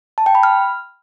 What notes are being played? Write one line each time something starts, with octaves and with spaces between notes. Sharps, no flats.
A5
G5
B5
F6